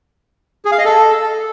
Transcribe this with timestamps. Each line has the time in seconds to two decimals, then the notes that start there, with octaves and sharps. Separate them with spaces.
0.65 G#4
0.72 F5
0.78 D#5
0.85 A4